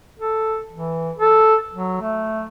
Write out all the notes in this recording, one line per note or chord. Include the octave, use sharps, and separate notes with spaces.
A4
E3
A4
F#3
A3